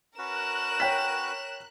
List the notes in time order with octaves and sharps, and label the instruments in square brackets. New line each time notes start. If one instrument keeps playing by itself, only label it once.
[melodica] C#4 F#4 B4 [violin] A#4 E7 [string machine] F#6
[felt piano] C#5 G5 B6